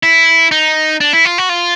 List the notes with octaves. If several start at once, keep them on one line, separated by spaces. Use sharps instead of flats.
E4
D#4
D4
E4
F4
F#4
F4